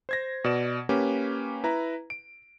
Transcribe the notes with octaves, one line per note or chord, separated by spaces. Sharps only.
C5 G#6 A#6
B2 D5 E7
A#3 C#4 G4 B4
E4 B4 A#5
D7